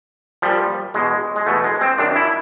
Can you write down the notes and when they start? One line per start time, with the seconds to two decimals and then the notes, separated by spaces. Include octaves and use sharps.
0.42 A#2 F3 G3
0.94 E2 B2 G#3
1.36 G#3
1.46 E2 B2 A3
1.64 G#3
1.81 C4
1.98 F#2 D#3 D4
2.16 E4